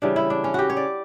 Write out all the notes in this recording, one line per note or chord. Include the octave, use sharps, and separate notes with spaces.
C#3 E3 G3 D4
E4
D4
C#4
F#4 G4
C#5
D5